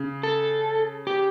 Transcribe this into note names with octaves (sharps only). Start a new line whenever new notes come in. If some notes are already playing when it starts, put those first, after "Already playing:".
Already playing: C#3
A4
G4